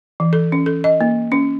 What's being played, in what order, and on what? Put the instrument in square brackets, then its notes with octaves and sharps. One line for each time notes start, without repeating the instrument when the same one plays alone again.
[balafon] E3
A4
C#4
A4
D#5
A#3
C#4